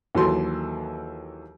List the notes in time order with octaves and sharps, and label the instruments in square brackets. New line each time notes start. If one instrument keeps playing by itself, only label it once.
[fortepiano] D#2 E3 F#3 A4 C6